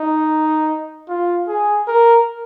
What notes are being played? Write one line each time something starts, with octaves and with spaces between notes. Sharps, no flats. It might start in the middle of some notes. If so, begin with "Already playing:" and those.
Already playing: D#4
F4
G#4
A#4